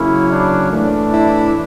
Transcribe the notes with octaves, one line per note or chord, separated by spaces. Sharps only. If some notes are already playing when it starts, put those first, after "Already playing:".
Already playing: C#3 F#3 A#3 C#4 E4
D4
A2 E3 A3 D4
E4